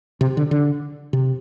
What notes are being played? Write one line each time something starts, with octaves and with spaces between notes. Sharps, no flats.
C3
D3
D3
C3